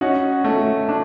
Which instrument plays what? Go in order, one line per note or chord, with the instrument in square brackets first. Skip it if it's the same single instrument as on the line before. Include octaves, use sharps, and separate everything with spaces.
[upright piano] C#4 D#4 [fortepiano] F#4
[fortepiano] A3
D4